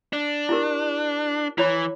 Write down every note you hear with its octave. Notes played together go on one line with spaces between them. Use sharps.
D4
E4 G4 A#4
E3 E4 C#5 B5